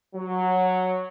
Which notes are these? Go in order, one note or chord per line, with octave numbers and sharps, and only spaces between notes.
F#3